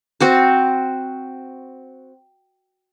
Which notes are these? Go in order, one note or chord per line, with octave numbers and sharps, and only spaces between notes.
C4 F#4 C5